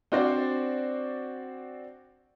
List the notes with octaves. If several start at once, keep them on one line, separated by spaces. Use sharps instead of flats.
C4 D4 F#4 C5 D5